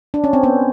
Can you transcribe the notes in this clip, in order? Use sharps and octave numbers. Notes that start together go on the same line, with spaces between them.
D4
C#4
C4
B3 C#4